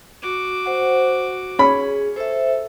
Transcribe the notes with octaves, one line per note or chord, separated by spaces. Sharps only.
F#4 D6
C5 F#5
C#4 G#4 B5
A4 C5 E5